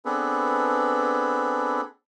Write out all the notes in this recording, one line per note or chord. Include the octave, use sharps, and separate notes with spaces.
B3 C4 D4 G#4 A4 B4